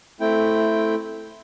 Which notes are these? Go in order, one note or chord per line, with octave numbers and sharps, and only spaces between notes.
A3 C4 E4 G5